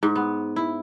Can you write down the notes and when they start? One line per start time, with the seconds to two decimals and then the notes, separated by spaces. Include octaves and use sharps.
0.03 G#2
0.16 B3
0.56 E4